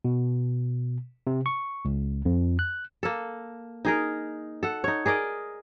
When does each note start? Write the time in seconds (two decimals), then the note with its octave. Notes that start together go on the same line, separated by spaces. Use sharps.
0.05 B2
1.27 C3
1.46 C#6
1.85 C#2
2.25 F2
2.59 F#6
3.03 A#3 A4
3.85 D#4 G#4 A#4
4.63 A4 F#5
4.84 D#4 C#5
5.06 G#4 A#4 D5 D#5